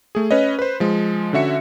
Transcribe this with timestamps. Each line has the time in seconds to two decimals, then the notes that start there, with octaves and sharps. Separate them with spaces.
0.15 A3 G#4
0.31 C#4 B4 C#5 D#5
0.59 B4 C5
0.80 F3 G#3
1.33 D3 C#4 F#4 E5 C#7